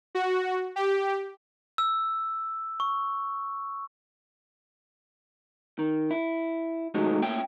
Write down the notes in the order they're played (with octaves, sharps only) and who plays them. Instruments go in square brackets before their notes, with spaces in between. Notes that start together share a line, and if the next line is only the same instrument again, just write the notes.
[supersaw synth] F#4
G4
[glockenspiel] E6
C#6
[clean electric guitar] D#3
E4
C3 D#3 F#3 G#3 A3 D#4
A3 A#3 C#4 E5 G5